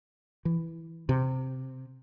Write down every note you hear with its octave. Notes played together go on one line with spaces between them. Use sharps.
E3
C3